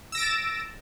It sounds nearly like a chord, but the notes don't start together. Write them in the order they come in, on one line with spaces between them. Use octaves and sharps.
E6 A#6 D7 A6 E7